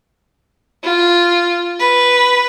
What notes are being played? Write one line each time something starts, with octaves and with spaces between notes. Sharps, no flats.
F4
B4